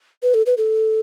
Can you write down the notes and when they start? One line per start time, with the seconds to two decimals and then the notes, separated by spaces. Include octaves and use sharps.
0.23 B4
0.34 A4
0.46 B4
0.58 A4